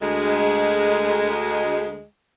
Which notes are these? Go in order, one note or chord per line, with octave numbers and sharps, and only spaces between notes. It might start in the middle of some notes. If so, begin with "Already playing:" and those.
D2 G#3